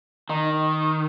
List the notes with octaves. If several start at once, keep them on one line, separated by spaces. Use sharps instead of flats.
D#3 D#4